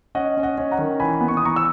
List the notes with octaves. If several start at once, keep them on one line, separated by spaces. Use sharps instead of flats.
C#4 D#5 F#5
C#4
D#5 F#5
C#4
F#5 A#5
D#3
E3 G#5 B5
B3
C#6
D#6
E3 A#5 C#6
C#6 E6